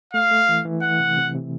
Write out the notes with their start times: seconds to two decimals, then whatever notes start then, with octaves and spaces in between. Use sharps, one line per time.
0.14 A3 F5
0.31 A3
0.49 E3
0.65 E3
0.82 E3 F#5
1.00 C3
1.17 C3
1.34 C3